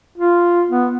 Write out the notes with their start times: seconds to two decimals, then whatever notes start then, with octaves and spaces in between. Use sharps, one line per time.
0.18 F4
0.69 B3